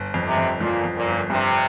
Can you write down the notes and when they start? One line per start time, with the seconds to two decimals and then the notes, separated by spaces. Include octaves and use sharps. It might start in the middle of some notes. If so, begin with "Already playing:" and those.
Already playing: G1
0.14 F2
0.26 C3
0.37 F2
0.60 A#2 F3
0.84 F2
0.95 A#2
1.07 G1
1.30 G2 C3